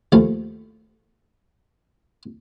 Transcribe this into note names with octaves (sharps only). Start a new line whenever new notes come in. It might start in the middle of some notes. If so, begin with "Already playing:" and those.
D#2 F3 A3